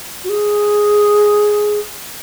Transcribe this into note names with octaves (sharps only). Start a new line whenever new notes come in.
F#4
G#4